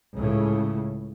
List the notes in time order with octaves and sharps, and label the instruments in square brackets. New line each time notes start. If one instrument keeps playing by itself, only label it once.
[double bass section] C#2 A2 C#3